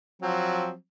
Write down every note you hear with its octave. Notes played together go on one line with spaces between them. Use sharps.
F3 F#3 C4